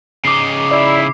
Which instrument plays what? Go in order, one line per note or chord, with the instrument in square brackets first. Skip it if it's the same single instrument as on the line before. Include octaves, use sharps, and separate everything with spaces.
[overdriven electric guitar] C#3 D#4 [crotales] D6 C7
[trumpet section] E4 [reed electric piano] D5